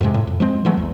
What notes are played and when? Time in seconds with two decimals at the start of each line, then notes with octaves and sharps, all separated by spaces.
0.01 F2 G#2 C3 G#3
0.14 A2
0.27 F2
0.40 F3 G#3 C4
0.65 E3 F#3 G#3 A3
0.77 A#1 E2